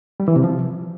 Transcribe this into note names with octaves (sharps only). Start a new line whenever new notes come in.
G3
E3
C3
F3